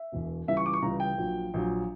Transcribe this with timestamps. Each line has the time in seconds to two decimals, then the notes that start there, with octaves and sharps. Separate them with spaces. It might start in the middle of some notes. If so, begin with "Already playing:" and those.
Already playing: E5
0.12 E1 E2 B2
0.48 C#2 C#3 E3 G3 E5
0.57 C#6
0.66 D6
0.73 C#6
0.82 C#2 C#3 E3 G3 A#5
1.00 G5
1.18 A#1 A#2 F#3
1.54 A#1 A#2 F#3